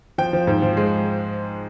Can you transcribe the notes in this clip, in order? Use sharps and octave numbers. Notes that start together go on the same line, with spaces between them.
F3 G5
F3
G#2
F3
G#3